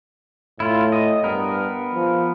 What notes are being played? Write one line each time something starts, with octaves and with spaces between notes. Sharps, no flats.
A2 E4 F4
D#5
G2 B3 A#4
F3